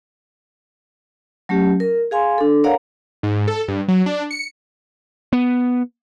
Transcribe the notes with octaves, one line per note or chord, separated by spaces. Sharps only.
F#3 A3 C#4 G4
A#4
G#4 F5 G#5 C6
D4 A4
A#4 C#5 D5 F5 F#5 A#5
G#2
A4
G2
F#3
D4
C#7
B3